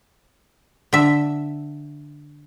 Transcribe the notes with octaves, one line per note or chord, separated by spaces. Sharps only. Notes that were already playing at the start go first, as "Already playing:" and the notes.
D3 E5